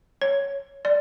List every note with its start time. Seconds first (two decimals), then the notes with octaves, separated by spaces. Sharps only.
0.21 C#5
0.85 D5